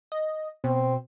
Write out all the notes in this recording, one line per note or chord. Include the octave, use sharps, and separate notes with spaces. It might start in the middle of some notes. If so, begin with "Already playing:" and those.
D#5
B2 C4